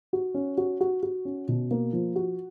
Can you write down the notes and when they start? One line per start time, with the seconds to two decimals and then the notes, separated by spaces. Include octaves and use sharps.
0.13 F#4
0.34 C#4
0.57 F#4
0.81 F#4
1.03 F#4
1.25 C#4
1.48 B2
1.71 A#3
1.93 F3
2.16 F#4